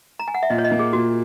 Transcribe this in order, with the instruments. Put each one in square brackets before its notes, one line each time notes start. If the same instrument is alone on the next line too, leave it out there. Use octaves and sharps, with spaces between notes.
[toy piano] A#5
G#5
F#5
E5
[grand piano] A#2 [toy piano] D#5
[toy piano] C#5
D#5
[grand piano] A#3
[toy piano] G#4
[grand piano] A#2 [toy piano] F#4